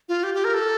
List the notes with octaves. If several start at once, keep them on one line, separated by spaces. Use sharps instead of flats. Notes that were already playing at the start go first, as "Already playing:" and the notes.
F4
G4
G4
A#4
A4